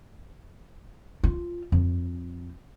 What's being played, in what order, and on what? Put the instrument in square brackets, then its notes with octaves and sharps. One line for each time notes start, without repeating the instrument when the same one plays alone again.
[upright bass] F4
F2